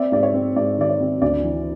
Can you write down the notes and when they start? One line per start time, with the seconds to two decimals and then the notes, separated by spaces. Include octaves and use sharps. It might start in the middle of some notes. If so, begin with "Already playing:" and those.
Already playing: C4 D5 E5
0.12 G#2 D5
0.23 C#5
0.34 C4
0.56 G#2 D5
0.78 D#3 D5
0.89 C#5
1.00 C4
1.22 D2 D5
1.44 E3